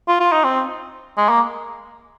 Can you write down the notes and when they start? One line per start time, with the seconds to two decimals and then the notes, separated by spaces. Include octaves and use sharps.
0.08 F4
0.20 F4
0.32 D#4
0.44 C4
1.17 G#3
1.29 A#3